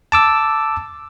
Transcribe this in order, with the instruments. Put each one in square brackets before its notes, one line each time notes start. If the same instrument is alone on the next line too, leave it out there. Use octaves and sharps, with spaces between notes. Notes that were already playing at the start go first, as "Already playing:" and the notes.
[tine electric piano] A5 D6 E6